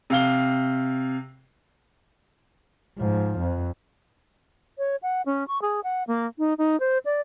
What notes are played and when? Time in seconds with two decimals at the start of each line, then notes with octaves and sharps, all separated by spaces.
0.10 C3 F5 G7
2.98 G#2 F3
3.40 F2
4.78 C#5
5.02 F#5
5.26 C#4
5.48 C#6
5.62 G#4
5.84 F#5
6.07 A#3
6.38 D#4
6.58 D#4
6.80 C5
7.05 D5